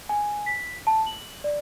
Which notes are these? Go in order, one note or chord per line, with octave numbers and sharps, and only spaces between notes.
G#5
B6
A5
F#7
D5